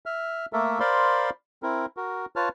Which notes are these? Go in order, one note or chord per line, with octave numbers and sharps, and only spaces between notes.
E5 F6
A3 A#3 A4 A#4 E5
A#4 C5 D5 F5 B5 C6
C4 E4 A#4
F#4 A#4
F4 B4 C#5 A5 F6